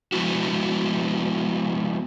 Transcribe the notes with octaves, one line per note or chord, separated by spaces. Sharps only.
F3 G#3 B3 E4 F#4